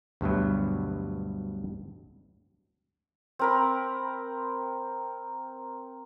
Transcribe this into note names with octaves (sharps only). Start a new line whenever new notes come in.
D2 G2 B2 F#3
C4 A#4 B5